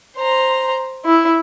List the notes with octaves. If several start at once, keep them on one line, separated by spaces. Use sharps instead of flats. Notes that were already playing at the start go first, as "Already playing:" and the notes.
C5 A#5
E4